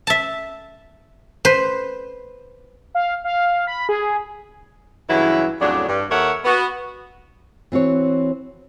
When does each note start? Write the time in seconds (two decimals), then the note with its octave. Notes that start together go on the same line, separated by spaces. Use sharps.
0.07 E5 A5
1.45 B4 C5
2.95 F5
3.24 F5
3.67 B5
3.89 G#4
5.08 G2 C#3 E3 F#3 E4
5.60 F2 A2 C#3 F#3 D4
5.88 G2
6.10 D#2 A4 A#4 C#5 E5 F#5
6.45 B3 F#4
7.72 E3 C4 F#4 C#5